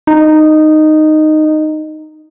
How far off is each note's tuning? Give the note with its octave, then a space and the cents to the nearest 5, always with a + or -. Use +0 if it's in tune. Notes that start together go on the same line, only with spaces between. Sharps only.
D#4 -10